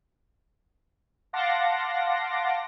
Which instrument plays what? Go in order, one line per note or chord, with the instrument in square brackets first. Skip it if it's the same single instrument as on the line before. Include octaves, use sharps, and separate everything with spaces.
[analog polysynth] F5 F#5 A5 C6 D6 A#6